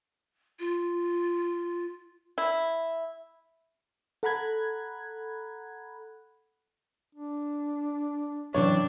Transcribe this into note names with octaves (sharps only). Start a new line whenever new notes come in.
F4
E4
A4 F#5 A#5 B5 F#6 G#6
D4
F#2 C3 E3 D4 C#5